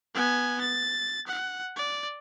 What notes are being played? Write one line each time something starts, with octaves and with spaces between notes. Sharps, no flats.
B3 G#5
A6
F#5
D5